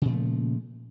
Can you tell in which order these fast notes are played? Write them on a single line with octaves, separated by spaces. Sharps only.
C#3 A#2 F3 A3